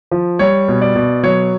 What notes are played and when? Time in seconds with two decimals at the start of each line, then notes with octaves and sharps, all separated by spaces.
0.11 F3
0.39 G3 C#5
0.68 B2
0.81 D5
0.95 B2
1.23 F#3 C#5